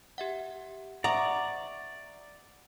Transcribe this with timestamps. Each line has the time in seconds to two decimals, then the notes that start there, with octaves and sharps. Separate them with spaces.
0.18 G4 E5 F#5
1.04 D5 E5 F#5 A#5 C#6 D#6